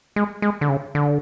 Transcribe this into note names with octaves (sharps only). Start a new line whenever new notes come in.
G#3
G#3
D3
C#3
D3